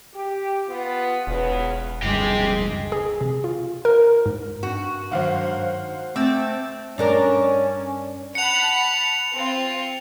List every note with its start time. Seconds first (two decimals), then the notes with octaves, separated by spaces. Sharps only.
0.14 G4
0.68 B3 F4
1.27 E1 E2 C#3 B3
2.02 F#1 C#2 G3 G#3 C4 G4
2.92 G#4
3.21 C3
3.44 F4
3.85 A#4
4.26 G#2
4.63 G2 F#4
5.12 G#2 D#3 F#3 C5 F5 F#5
6.16 A3 C4 D6 E6 A6
6.98 G2 C#4 D4 A#4
8.35 F#5 A5 B5 C#7 F7
9.33 C4 F4